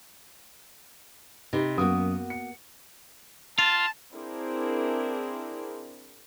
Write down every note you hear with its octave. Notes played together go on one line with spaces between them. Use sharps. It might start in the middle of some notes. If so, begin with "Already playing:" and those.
C3 D#4 B4
F#2 A#3 B3 F#4 D#6
C#7
F4 A5
C4 D4 E4 G#4 A#4